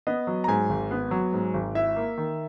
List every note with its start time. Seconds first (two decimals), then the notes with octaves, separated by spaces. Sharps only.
0.07 B3 D#5
0.27 F#3
0.44 A#5
0.48 G#2 G#5
0.69 G#1
0.91 B3
1.11 F#3
1.33 G#2
1.54 G#1
1.75 E4 E5
1.96 A#3
2.17 D#3